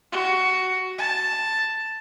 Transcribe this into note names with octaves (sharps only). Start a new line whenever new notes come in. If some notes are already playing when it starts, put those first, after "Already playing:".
F#4
A5